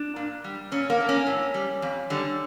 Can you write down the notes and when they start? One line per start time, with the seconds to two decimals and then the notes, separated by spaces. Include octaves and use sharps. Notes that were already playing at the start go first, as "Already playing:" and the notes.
Already playing: D4
0.16 A#2
0.44 G3
0.72 A#2 C#4
0.90 A#3
1.00 A3
1.09 C#4
1.27 A2
1.54 G3
1.82 F2
2.10 D3 G3